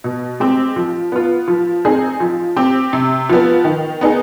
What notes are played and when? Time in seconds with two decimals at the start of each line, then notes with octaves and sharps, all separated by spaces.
0.04 B2
0.40 G#3 C4 G4
0.76 F3
1.12 B3 F4
1.48 F3
1.85 C4 D#4 G#4
2.20 F3
2.56 C4 G4
2.93 C3
3.29 F3 B3
3.64 D#3
4.01 B3 D#4 G#4